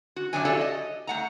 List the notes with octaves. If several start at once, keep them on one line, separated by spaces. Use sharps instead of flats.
F#4
F#2 C#3 F#3 D4 D5 G#5
F#4 G4 A4 C#5 D5 E5
D#5
A3 F#5 A#5